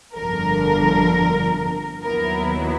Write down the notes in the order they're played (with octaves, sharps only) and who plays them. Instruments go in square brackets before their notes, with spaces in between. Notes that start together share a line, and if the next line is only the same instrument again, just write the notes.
[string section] G1 F2 D3 F3 A#4
D#2 D#3 F#3 B3 E4 A#4